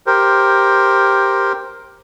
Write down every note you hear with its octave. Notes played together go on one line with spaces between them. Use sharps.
G4 A#4 C5